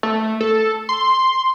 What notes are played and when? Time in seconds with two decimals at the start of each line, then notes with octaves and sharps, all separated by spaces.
0.03 A3
0.41 A4
0.89 C6